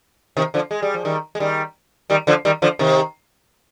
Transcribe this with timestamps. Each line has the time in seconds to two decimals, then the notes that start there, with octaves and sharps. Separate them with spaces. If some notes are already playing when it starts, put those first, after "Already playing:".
0.37 C3 D#3
0.54 D3 F3
0.71 G#3
0.82 G3
0.94 F3
1.05 D#3 G3
1.35 G#3
1.40 D#3 G3
2.10 D#3 G3
2.27 D3 F3
2.45 D#3 G3
2.62 D3 F3
2.79 C3 D#3